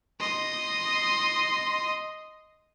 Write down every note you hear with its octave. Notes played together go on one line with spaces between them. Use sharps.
D#5 C6